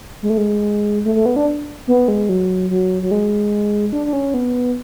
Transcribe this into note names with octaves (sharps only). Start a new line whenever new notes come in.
G#3
A3
G#3
A3
A3
B3
D4
B3
G#3
F#3
F#3
F#3
G#3
D4
D4
C#4
B3